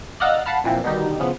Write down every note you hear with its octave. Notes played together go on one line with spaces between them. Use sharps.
D5 D#5 F5 F#5 A#5 E6
F5 F#5 A5 B5 F6
F2 A#2 E3 C4
B2 D3 D#3 G3 D#4 G4
C#3 E3 F3 B3